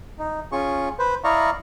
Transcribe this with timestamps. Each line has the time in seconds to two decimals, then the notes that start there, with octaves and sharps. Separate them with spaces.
0.19 D#4
0.52 C#4 F4 G#4 C#6
0.99 B4 C5
1.24 E4 D5 D#5 F5 A#5 C#6